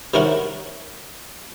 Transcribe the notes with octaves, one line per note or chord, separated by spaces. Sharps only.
C3 D#3 C#4 E4 A#4 F#5